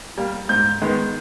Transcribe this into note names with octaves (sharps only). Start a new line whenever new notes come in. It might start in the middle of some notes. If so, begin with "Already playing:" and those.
G3 A#3
G#2 G6
D#3 G#3 B3